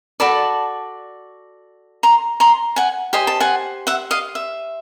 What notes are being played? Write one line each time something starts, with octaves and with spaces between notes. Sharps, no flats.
F#4 A4 D5 A5 B5
A#5 C6
A#5 C6
F#5 G#5
G4 C5 D#5 G#5
A5
F#5 G#5
E5 F#5
D#5 F5
E5